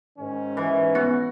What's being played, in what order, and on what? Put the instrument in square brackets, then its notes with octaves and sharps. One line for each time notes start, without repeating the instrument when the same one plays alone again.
[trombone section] G#2 D#3 C#4
[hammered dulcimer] E3
[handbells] B3 [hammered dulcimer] F#4